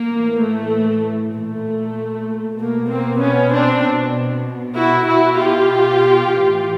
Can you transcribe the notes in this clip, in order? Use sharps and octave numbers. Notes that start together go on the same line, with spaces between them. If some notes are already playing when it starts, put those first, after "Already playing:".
Already playing: A#3
A2 E3
A3
A#2 A3
B2 A#3
A#3 C4
B3 C#4
C4 D4
B2
E4 F#4
B2 E4 F#4
F4 G4
E3
A2